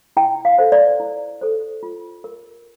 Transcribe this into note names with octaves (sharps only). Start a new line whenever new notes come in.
E4 G5
F5
A4 C5
D5
E4
A4 C5
F4
A#4